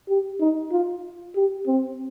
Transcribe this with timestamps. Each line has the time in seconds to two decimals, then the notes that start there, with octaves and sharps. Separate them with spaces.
0.09 G4
0.40 D#4
0.72 F4
1.36 G4
1.67 C4